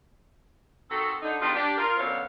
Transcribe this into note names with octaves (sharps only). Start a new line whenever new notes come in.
D#3 C4 F#4 A4
D3 D#4
D#3 G3 G#3 B3 D4 F4
D4 G4
F4 A#4
F#2 B2 D3 C4 C#5 F5